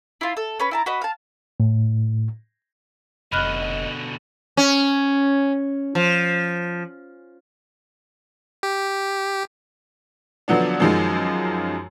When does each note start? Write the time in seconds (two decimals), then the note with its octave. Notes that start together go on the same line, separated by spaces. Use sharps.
0.21 E4 F4
0.37 A4
0.60 C#4 B4 B5
0.71 E4 A5 A#5
0.86 F#4 B4 D#5
1.01 F5 A5
1.60 A2
3.32 F1 B2 D3 G3 D#5 B5 F6 F#6
4.57 C#4
5.95 F3
8.63 G4
10.48 D3 F3 F#3 B3 D4
10.80 F#2 D#3 F3 F#3 G#3